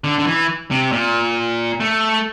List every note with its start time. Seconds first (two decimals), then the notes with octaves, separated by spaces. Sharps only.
0.04 D3
0.19 D3
0.27 E3
0.71 C3
0.92 A#2
1.80 A3